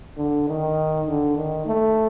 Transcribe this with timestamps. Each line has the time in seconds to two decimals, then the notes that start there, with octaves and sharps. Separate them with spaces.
0.18 D3
0.48 D#3
1.07 D3
1.37 D#3
1.66 A3